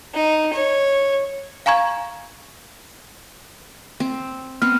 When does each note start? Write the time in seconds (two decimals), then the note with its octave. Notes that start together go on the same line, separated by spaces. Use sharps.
0.14 D#4
0.53 C#5
1.66 F5 G#5 A#5 C#6 G#6
4.00 C4
4.62 B3 C4 F6